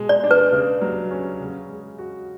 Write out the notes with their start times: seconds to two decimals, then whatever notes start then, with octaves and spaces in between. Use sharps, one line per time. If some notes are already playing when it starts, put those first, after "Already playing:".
Already playing: B2 G#3
0.09 D5
0.24 D4
0.31 B4
0.52 C#3
0.81 F#3
1.11 C#4
1.40 C#3
1.69 G#3
1.98 F#4